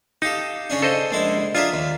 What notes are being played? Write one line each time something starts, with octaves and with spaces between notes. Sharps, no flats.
D#4 G4 A4 F5
C#3 C#4 D4
A4 C5 D#5
A#1 G#3 E4
D4 F4 G#4 A#4 E5
D#2